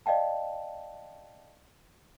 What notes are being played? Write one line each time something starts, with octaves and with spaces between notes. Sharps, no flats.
D5 D#5 F5 G5 A5